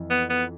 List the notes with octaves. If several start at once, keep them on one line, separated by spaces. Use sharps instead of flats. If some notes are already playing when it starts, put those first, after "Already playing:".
Already playing: F2 E3
B3
B3